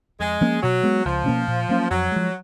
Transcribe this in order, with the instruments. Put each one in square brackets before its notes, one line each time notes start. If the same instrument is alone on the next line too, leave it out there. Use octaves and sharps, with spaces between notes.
[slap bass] F2 [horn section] G#3
[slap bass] F3 A#3 C#4
[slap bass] B2 [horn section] F#3
[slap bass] G#3 B3
[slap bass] C#2 [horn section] F3
[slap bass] B2 A#3 C#4
A#2
F#3 A#3 C#4
[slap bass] F2 [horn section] F#3
[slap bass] F3 G#3